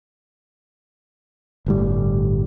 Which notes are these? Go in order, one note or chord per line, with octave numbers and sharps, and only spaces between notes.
G1 A2 G3